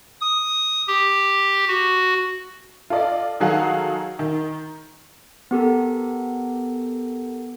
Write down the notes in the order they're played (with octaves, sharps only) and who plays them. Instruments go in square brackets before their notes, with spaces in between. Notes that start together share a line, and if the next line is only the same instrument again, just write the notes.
[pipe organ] D#6
G4
F#4
[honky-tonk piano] F4 A4 D5 D#5
D#3 F#3 G#4 A4 F5 F#5
D#3
[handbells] B3 G4 A4 A#4